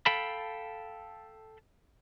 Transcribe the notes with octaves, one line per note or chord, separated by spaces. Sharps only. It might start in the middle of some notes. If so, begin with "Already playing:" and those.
A4 F5 G5 A5 B5